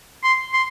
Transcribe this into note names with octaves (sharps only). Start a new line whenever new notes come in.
C6
C6